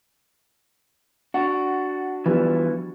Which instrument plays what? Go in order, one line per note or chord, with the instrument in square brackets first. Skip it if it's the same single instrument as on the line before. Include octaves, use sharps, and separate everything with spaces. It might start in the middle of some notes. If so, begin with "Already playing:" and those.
[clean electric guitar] D4 F#4 [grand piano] F#5
[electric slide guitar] E3 F3 [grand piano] G3 B3